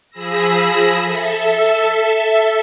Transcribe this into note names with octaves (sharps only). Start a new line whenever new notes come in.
F3 G#4 B5 E6 A#6
A4 E5